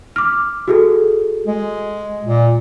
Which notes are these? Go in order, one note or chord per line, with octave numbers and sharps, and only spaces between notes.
D6 F6
F#4 G#4 A4
G#3
A#2